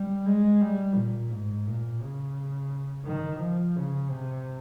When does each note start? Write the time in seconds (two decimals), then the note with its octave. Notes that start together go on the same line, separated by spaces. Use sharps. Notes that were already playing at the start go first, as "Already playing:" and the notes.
Already playing: G3
0.26 G#3
0.61 G3
0.96 A#2
1.30 G#2
1.66 A#2
2.01 C#3
3.05 D#3
3.41 F3
3.76 C#3
4.10 C3